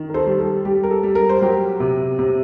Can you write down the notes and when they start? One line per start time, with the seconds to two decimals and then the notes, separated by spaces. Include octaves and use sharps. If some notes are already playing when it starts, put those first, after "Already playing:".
Already playing: D#3
0.09 A#4
0.14 A4 C5
0.26 G3
0.39 A4
0.65 G3 G4
0.83 A#4
0.91 A4
1.03 G3
1.15 A#4
1.29 C5
1.41 F#3 G4 A#4
1.80 C3
2.19 C3